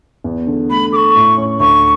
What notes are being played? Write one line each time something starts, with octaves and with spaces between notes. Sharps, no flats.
E2
D3
A3 B5
A4 C#6 D6
A2
C#4
D2 C#6